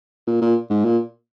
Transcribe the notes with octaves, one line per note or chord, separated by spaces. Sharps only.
A#2
A#2
G#2
A#2